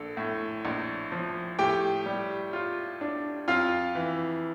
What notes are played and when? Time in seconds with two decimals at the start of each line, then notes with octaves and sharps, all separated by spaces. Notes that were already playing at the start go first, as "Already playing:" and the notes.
Already playing: A#1 A4
0.17 A2
0.65 A#1
1.12 F3
1.59 A2 G4 G5
2.06 G3
2.53 F4
3.01 D4
3.48 F2 F4 F5
3.95 E3